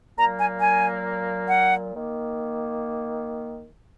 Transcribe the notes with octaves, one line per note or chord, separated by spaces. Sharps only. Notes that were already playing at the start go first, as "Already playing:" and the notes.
A#2 F#3 A#3 A#5
G#5
G#5
F#5
D#3 A#3